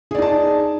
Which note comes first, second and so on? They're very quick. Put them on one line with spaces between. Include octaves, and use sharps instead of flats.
G#4 D5 D#4 A5